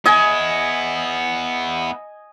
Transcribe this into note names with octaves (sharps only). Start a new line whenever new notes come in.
B3 E4 D#5 G#5